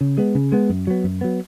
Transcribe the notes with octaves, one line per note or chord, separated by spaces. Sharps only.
C#3
G#3 B3
C#3
G#3 B3
F#2
F#3 B3
F#2
F#3 B3